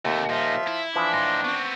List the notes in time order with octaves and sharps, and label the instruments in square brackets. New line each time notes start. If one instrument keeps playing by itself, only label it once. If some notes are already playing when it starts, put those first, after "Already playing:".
[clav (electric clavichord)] D#2 [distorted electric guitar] C3 A3
[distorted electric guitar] A#2 D#4 [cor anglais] F3 [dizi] E5
[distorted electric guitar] E4
[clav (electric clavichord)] E3 F3 [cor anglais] D4
[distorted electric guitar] A2 D#4 [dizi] C6
[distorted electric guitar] B3 C4 [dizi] C#6